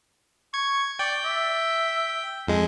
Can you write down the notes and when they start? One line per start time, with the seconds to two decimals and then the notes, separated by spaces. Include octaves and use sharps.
0.54 C#6 G#6
0.99 D5 G5
1.25 E5
2.47 F2 G#3